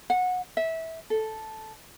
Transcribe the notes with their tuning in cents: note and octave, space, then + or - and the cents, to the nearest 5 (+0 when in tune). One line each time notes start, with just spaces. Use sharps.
F#5 -20
E5 -20
A4 -5